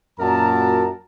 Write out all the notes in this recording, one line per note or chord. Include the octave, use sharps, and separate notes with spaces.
F#2 A#2 F#4 A#4 A5 A#5